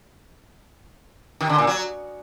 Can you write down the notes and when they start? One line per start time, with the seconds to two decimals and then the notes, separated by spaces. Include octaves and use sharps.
1.41 D#3
1.49 D3
1.58 A#2
1.67 F#3